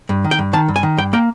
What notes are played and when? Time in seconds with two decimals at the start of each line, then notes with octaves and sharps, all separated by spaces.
0.09 G2
0.24 D#3
0.31 G5
0.39 G2
0.53 D#3 A5
0.68 G2
0.76 G#5
0.83 D#3
0.98 G2 G5
1.13 A#3 G5